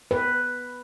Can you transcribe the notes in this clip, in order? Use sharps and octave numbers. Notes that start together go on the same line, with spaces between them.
B4